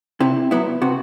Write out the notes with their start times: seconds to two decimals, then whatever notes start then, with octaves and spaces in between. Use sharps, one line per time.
0.20 C3 E4
0.51 F#3 B3 E4
0.82 C3 F#4